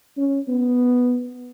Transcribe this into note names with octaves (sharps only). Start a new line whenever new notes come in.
C#4
B3